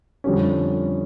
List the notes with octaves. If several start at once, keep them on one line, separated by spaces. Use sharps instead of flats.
F2 D3 G3 C#4